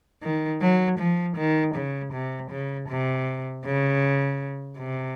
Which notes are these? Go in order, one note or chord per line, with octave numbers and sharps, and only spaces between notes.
D#3
F#3
F3
D#3
C#3
C3
C#3
C3
C#3
C3